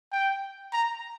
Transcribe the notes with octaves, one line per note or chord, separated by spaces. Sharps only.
G5
A#5